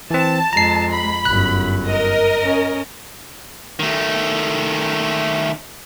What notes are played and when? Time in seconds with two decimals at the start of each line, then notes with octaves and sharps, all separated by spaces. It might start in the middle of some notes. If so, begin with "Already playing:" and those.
0.11 E3 C4 A5
0.53 F2 G#3 A#5 C7
0.92 B5
1.25 G1 F#2 F#6
1.85 A#4 D#5
2.43 C#4
3.79 D#3 A3